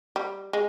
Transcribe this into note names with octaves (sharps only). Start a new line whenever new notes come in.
G3
G#3